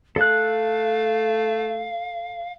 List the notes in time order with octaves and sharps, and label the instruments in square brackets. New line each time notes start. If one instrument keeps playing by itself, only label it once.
[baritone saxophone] A3 [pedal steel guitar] A4 F#6 [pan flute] F5